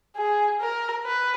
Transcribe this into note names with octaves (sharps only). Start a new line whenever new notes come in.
G#4
A#4
B4